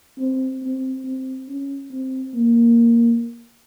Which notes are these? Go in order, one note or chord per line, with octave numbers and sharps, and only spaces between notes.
C4
C4
C4
C#4
C4
A#3